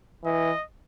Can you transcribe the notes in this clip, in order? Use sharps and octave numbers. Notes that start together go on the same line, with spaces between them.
E3 D#5